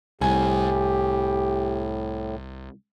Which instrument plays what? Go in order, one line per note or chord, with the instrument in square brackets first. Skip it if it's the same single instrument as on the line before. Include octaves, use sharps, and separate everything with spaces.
[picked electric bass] C2 [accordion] A2 [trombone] G4 [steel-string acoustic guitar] G#5